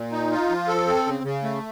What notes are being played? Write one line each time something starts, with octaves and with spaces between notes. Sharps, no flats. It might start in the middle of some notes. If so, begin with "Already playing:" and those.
Already playing: A#2
D#4
F4
F3
A4
C4
C#3
C#3
A3